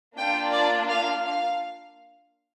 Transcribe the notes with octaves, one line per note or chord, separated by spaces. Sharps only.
A#3 D4 F4 G5
D5
F5
F5